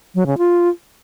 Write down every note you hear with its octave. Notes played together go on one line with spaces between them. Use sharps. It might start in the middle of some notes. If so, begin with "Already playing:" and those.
F#3
C#3
F4